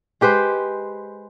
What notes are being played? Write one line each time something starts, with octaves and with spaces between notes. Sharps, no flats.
G#3 G4 B4 C5